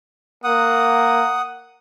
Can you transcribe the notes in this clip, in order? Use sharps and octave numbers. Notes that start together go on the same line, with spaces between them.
A#3 F#5 D#6